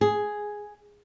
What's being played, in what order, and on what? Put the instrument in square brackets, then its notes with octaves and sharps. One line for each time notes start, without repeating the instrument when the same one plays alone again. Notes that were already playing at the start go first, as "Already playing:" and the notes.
[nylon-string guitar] G#4